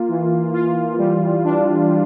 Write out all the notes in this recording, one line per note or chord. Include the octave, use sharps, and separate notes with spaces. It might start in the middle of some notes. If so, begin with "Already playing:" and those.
Already playing: A#3 F4
E3
F4
G3
D4
G3